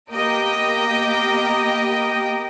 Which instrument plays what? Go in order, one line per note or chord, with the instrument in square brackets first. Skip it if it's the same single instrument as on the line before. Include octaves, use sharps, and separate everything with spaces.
[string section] A#3 B3 G4 A#4 D#5 G5